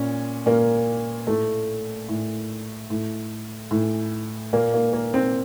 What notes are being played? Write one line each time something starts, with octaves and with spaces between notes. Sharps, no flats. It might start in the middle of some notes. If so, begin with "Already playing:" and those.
Already playing: A#2 C#4
A#2 A#3
A2 A3
A2
A2
A2
A#2 A#3
A#3
A#3
C4